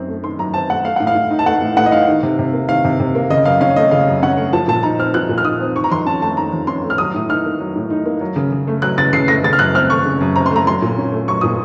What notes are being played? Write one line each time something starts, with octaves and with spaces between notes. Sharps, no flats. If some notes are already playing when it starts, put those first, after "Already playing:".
Already playing: F#2 D#3 C4
A3
D#3 C6
F#2 A#5
C4 A5
A3 F#5
A3 F5
A2 F#5
F5
A2
D#4
A5
A3 F#5
A2
A2 F#5
D#5
D#4 F5
D#3
C3
C3
A#3
D#3 F5
C3
C3
A#3
C#3 D#5
F#2 F5
C#4 F5
A3 D#5
C#3 F5
F#2
C#4 F#5
A3
F3 A5
A#2 A5
D#4 A#5
C4 F6
F3 F#6
A#2
F6
D#4 D#6
C4
D#3 C#6
A#5
F2 C6
C#4 A5
A3 A5
D#3 A#5
F2
C#4 C6
A3
F6
F#3 D#6
A2
D#4 F6
A#3
F#3
A2
D#4
A#3
F#3
C#3
C#3
A3
F#3 F#6
C#3 A6
C#3 C7
A3 A#6
C#3 A6
F6
F#2 F#6
C4 F6
A3 C#6
C#3
F#2
C4 A#5
C6
A3 A#5
F#3 C6
A#2
C#4
A3
F#3 C#6
A#2 D#6